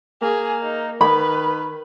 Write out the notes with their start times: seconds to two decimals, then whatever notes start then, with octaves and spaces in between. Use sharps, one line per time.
0.22 A#3 G#4
0.62 D#4
1.01 D#3 B4 B5